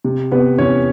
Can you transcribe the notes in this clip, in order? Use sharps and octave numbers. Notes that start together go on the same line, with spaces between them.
C3
C3 B3 B4
E3 C#4 C#5